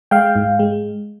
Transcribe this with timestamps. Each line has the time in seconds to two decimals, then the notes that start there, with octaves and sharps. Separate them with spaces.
0.11 G#3 F5 G5
0.36 G#2
0.59 G#3